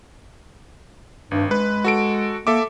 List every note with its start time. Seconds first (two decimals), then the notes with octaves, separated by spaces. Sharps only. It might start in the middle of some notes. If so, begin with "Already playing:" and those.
1.31 G#1 G2
1.51 G#3 B4
1.84 F#4 A4 D7
2.47 A#3 A4 E5 D6